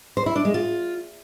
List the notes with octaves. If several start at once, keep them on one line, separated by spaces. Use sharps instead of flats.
C5
E4
D4
G#3
F4